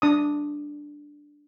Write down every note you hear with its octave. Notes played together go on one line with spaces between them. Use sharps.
D4 D#6